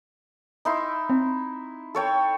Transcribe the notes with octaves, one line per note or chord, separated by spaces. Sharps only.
D#4 E4 C6
C4
A4 C#5 G5